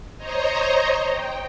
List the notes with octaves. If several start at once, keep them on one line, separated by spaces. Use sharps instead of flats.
C5 C#5 D#5 A#5
G5